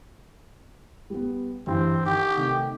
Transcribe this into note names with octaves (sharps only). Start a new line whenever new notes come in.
G3 B3
G2 E3 G3 C4
D#3 G4
C3 D#3 A3